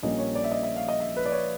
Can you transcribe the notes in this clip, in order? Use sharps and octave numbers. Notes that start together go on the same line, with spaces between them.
A#1 A#2 G3 A#3 C#4 D#5
C#5
D5
E5
D#5
E5
F5
D#5
E5
B4
D5
C#5